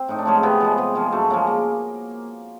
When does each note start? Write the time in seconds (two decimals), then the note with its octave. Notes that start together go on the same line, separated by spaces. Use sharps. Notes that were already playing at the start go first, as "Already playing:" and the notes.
Already playing: C4
0.08 A2 D#4
0.18 D4
0.25 F3 G#3 C#4
0.35 C4
0.43 C3 B3
0.60 F3 G#3
0.77 C3 B3
0.95 F3 G#3 A#3
1.12 F#2 A3
1.30 C#3 F3 G#3 A#3
1.47 A#3